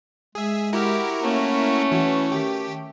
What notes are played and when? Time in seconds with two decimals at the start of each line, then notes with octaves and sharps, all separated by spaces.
0.35 G#3 G#4 E5
0.73 E4 F#4 G4 A#4
1.22 A3 A#3 C#4
1.92 E3 F#4
2.32 D#3 G4